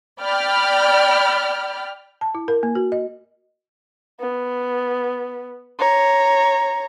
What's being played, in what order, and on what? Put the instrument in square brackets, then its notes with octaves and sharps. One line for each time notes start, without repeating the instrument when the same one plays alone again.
[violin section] D5 G5 B5 F6
[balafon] A5
E4
A#4
A#3
F#4
D#5
[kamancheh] B3
C#5 A#5